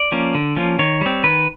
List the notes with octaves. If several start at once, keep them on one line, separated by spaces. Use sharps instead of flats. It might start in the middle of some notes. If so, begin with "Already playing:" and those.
Already playing: D5
F3 A#3 C#4
D3
F3 A#3 C#4
D#3 C#5
G3 C4
D#3 B4